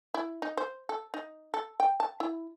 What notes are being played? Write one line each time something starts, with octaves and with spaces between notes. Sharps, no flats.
E4
D#4
C5
A4
D#4
A4
G5
A5
E4